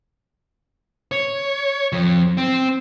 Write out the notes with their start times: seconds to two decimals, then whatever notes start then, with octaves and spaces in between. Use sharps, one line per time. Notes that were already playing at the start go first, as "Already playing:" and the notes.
1.12 C#5
1.93 F2 F3
2.37 C4